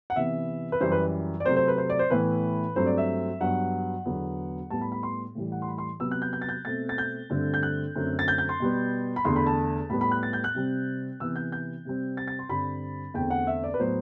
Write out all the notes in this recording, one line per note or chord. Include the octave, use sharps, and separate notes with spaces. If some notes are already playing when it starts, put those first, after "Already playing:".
F#5
C3 E3 B3 E5
B4
F#2 E3 G3 C5
B4
D5
C3 F#3 A3 C4 C5
C5
B4
C5
D5
C5
A2 E3 B3 B4
G2 F#3 A3 C4 C5
D5
E5
G2 F#3 B3 F#5
E2 D3 F#3 B3
A2 G3 B3 A5
B5
B5
C6
A2 E3 G3
F#5
C6
B5
C6
C3 F#3 B3 E6
F#6
G6
G6
A6
G6
B2 A3 C4 A6
A6
G6
G2 D3 A3 C4
G6
F#6
F#2 D3 A3 C4
A6
G6
G6
C6
B2 G3 B3
B5
E2 D3 A3 C6
B5
A5
A2 G3 B3 B5
B5
F#6
A6
G6
F#6
C3 G3 C4
C3 E3 B3 E6
G6
G6
C3 G3 C4
A6
A6
C6
G2 D3 G3 C4 B5
E2 D3 A3 C4 G5
F#5
E5
D5
B4
A2 F#3 B3 C5